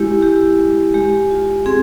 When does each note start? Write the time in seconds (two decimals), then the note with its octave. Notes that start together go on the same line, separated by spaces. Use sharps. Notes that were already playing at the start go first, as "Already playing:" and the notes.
Already playing: G#3 E4 G4
0.22 E4 G4
0.59 G#3
0.94 G#3 G4
1.31 F4
1.66 C4 G#4